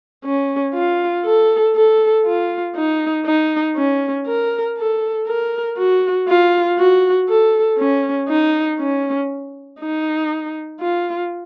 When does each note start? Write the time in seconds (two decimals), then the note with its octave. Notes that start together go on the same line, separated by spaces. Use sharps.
0.25 C#4
0.74 F4
1.25 A4
1.75 A4
2.26 F4
2.75 D#4
3.26 D#4
3.76 C#4
4.27 A#4
4.77 A4
5.27 A#4
5.77 F#4
6.28 F4
6.78 F#4
7.29 A4
7.78 C#4
8.29 D#4
8.79 C#4
9.80 D#4
10.80 F4